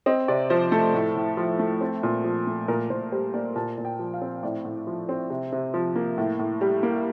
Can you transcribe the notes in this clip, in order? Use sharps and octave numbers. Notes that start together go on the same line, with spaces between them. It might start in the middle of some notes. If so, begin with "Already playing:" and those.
C4 D#5
C3 D5
F3 C5
A3 A4
A2
A2
F3
A3
C4
A#2
F3
A3
A#2 A#4
A#2 C5
G3 C5
A#3 D5
A#2 A5
A#2
G5
F3
F5
C4
A2 D5
A2
F3
C4
C3
C3
F3
A#3
A2
A2
G3
A#3